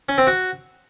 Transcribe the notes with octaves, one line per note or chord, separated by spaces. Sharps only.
C#4
C4
F#4